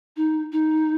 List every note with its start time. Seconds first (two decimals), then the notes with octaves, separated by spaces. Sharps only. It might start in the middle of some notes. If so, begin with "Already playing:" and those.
0.17 D#4
0.52 D#4